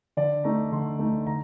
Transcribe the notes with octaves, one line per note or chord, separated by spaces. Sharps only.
D3 D5
A3 D#4 A#5
D3 C6
A3 D#4
D3 A#5